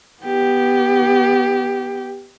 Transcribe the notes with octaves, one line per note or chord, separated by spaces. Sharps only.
B3 G4